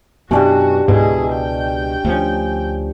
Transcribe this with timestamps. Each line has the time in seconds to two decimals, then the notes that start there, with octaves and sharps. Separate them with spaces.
0.31 F#2 B2 E3 C#4 D4 F#4 G4
0.88 C#2 G#2 B2 G#3 E4 G#4
1.34 G5
2.05 D2 F3 C#4